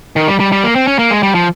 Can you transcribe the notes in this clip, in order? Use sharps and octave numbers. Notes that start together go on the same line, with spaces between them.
D#3
G3
G3
G3
A#3
C4
C#4
A#3
G#3
G3
F3